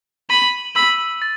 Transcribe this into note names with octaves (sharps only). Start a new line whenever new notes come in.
B5 D#7 F#7
B5 E6
A6